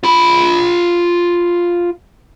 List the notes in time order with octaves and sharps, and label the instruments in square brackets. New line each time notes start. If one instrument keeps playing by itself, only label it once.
[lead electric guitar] F4 B5